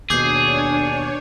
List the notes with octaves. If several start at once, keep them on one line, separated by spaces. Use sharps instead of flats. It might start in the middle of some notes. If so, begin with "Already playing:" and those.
D#2 B2 D4 G#4 C#5 D6 G6 C7